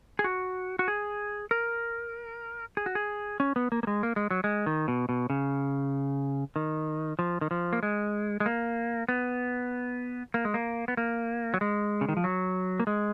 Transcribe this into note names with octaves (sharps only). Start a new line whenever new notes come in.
G#4
F#4
F#4
G#4
A#4
G#4
F#4
G#4
C#4
B3
A#3
A#3
G#3
A#3
G#3
F#3
G#3
D#3
B2
B2
C#3
D#3
F3
D#3
F3
A#3
G#3
G#3
A#3
B3
A#3
G#3
A#3
B3
A#3
F#3
G#3
C#3
D#3
F3
F#3
A#3
G#3